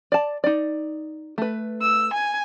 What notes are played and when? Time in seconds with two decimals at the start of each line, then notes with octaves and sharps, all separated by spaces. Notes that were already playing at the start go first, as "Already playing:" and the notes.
0.12 D5 A5
0.44 D#4 D5
1.38 A3 B4
1.82 E6
2.14 G#5